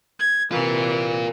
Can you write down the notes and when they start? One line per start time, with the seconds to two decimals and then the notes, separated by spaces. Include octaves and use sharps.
0.20 G#6
0.52 C3 E3 F4 A#4